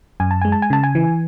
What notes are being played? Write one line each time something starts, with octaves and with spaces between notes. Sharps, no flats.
F#2 G#5
A5
G#3 G#5
A5
G#5
C#3 A5
G#5
E3